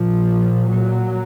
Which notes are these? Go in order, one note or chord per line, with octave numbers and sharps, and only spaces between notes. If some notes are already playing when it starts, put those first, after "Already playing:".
Already playing: A#2 F3
F#3